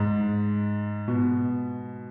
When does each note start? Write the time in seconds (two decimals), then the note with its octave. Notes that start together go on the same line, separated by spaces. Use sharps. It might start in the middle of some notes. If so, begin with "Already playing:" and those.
Already playing: G#2
1.08 B2